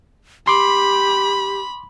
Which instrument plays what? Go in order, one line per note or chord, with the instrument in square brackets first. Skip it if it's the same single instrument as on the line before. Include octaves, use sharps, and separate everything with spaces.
[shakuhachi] G4 [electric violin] B5 [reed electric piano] C6 D6